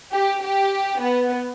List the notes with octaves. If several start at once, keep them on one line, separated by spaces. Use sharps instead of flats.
G4
G4
B3